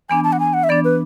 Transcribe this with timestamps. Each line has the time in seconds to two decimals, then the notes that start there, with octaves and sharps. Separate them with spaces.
0.10 E3 B3 D4 G#5
0.24 A5
0.33 F#5
0.40 G#5
0.54 F#5
0.64 E5
0.69 E3 B3 D4 D5
0.85 B4